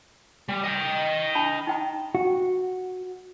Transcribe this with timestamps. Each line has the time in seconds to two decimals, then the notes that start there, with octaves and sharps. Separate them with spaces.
0.49 G3
0.64 D#5 G5
1.35 D4 A5 B5
1.67 D#4 G5 A#5
2.15 F#4